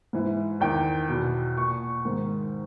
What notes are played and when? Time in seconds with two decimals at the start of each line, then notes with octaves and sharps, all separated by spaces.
0.13 G#2 E3
0.61 E2 D#3 G5
1.09 E2 B2
1.57 A#2 C#6
2.05 G#2 D#3